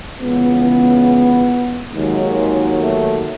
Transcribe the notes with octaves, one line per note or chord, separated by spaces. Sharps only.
C#2 C#3 E3 B3
D#2 D#3 F#3 G#3
A3